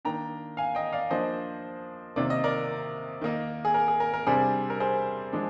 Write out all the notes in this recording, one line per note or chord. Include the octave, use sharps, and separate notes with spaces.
D#3 A#3 D4 G5 A#5
F5 G#5
D#5 G5
D5 F5
F3 A#3 D4 C5 D#5
C3 D#3 A#3 D5
D#5
A#4 D5
D#3 A#3 D#4
G#4
A#4
G#4
A#4
A#4
C3 G3 D4 G#4 C5
A#4
G#4 C5
F3 G#3 D4